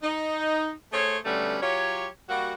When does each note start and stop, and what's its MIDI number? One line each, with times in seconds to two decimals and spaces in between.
0.03 0.71 63
0.93 1.18 57
0.93 1.18 68
0.93 1.18 72
0.93 1.18 73
1.25 1.57 47
1.25 1.57 50
1.25 1.57 55
1.25 1.57 57
1.25 1.57 61
1.62 2.06 54
1.62 2.06 65
1.62 2.06 67
1.62 2.06 73
2.29 2.54 55
2.29 2.54 58
2.29 2.54 66